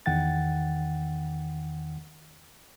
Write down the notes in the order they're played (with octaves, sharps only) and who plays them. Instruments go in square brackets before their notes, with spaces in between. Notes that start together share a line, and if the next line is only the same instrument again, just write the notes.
[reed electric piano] E2 D#3 F#5 G5 A6